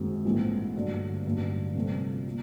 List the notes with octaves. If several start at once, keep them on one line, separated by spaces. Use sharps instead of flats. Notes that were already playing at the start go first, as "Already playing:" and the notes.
Already playing: F#1 F#2 D#3 G#3 C4
A#1 G#2 E3 A3 C4
G2 D3 F#3 A3
A1 G2 D3 F#3
C3 F3 A3 C4 F4
A#2